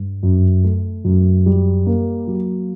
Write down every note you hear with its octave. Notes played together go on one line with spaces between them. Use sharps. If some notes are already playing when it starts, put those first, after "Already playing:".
Already playing: G2
F#2
A3
F#2
G3
A#3
F#3